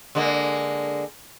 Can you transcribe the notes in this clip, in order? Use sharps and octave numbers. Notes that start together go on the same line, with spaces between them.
D3 G#3 A#3